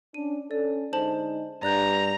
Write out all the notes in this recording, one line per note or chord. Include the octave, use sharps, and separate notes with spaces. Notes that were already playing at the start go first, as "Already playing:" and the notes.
C#4 D4 D#7
C#4 A4 D5
D3 G#3 D#4 C5 A5 F#7
G2 D5 A#5 F#6 G6